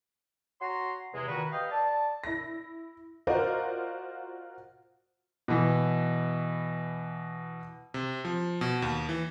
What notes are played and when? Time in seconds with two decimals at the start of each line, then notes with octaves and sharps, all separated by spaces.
0.61 F#4 C#5 A#5 C6
1.14 E2 C3 G#3
1.28 A#2 D#3 F#4 B4 A#5
1.52 G4 B4 D#5 F5 G5
1.72 D5 A5
2.24 E4 A#6
3.27 F4 F#4 A#4 C5 D5 D#5
5.48 B2 E3
7.94 C3
8.25 F3
8.61 B2
8.82 D#2
9.09 E3